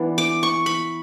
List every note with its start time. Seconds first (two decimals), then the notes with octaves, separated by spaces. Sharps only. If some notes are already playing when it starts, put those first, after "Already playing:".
Already playing: E3 B3 D4
0.18 D6
0.43 C#6
0.66 B5